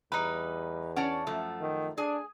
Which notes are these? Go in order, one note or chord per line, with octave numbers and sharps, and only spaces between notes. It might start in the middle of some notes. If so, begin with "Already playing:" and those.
E2 G3 D#4 B4
C#4 C#5 D5 F#5 A5 D6
F#2 F3 A3
D#3
D4 G#4 G#5